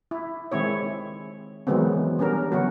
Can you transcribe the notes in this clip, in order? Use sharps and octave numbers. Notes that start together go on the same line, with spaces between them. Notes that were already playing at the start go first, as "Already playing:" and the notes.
E4
D#3 G#3 C4 E4 C#5
D#3 E3 F#3 G#3 B3 C4
G3 B3 C#4 D4 A#4
D3 F#3 B3 C#4 F#4